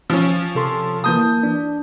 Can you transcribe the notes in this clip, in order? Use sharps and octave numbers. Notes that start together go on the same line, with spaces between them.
F3 C#4
C3 A4 C6
E3 A#3 A5 D#6 G6
D4